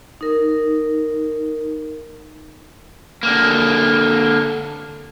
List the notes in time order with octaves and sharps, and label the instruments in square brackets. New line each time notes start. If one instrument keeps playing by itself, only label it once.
[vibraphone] D#4 A#4
[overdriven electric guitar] D3 A#3